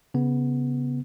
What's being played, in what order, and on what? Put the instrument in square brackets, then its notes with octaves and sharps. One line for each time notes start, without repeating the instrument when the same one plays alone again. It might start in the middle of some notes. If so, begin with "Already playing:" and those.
[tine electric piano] C#3 B3